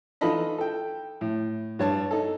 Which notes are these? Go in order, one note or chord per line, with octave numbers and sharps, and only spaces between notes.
E3 D#4 F4 A4 D#5 B5
A4 G5
A2
G2 C#5 A5
D#4 A4